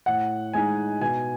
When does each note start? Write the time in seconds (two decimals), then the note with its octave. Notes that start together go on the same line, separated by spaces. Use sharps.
0.06 A2 F#5
0.53 G#3 D#4 G#5
1.01 B2 G#5